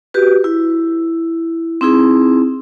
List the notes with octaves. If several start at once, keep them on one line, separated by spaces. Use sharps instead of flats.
F#4 G4 B4
E4
C4 D#4 E4 G#4